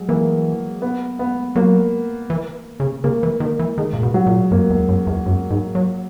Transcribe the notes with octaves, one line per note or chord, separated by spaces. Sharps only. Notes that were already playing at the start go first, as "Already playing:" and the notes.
Already playing: F#3 G#3
E3 A#3
B3
B3
F#3 A#3
E3
C#3
C#3 A#3
E3
D#3 A#3
E3
D#3 G#3
A#2
B2
F#3
A#2
F#2 A#3
E2
F#2
E2
F#2
G#2
F#3